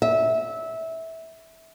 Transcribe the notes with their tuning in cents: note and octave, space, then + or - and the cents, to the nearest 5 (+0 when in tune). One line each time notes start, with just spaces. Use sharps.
E5 -20